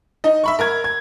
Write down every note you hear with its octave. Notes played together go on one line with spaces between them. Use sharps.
D#4 D#5
E5 B5 C#6
A#4 A#5 G#6
G#6